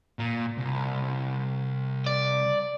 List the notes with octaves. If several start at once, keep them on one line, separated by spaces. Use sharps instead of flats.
A#2
C2
D5